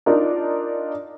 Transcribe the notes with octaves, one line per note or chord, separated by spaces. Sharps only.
D4 D#4 F4 A#4 D5